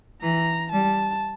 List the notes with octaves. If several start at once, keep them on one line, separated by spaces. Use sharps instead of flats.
E3 A#5
G3 A5